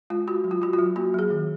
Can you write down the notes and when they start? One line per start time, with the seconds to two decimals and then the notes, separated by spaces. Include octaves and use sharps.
0.10 G#3 F4
0.28 F4 F#4
0.44 F#3
0.51 F4
0.62 F4 F#4
0.73 F4
0.78 F#3
0.96 A#3 F#4
1.14 F#3 G#4
1.30 D#3